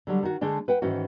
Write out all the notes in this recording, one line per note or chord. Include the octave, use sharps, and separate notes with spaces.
D3 F#3 G3
D#3 F#4
D3 G#3 A3 D4
B4 F#5 G5
G#2 D#3 E3 C#4 E4 F#4